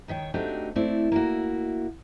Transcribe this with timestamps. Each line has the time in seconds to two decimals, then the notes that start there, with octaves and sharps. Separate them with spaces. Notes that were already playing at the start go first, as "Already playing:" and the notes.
0.08 D#2 D#3 C#5 G5
0.34 A3 C4 D4 D#4 F#4 G4
0.75 A3 C4 E4 D5
1.12 A#3 E4 F#4